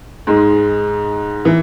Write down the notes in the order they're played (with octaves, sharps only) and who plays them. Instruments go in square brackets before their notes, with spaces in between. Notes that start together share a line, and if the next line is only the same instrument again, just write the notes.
[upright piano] G#2 G#3
E3